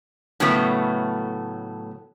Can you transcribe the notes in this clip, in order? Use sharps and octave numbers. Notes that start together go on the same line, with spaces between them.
A2 C#3 F#3 A3 B3